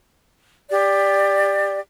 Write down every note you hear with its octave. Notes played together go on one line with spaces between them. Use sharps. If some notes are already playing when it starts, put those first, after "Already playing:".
G4 D5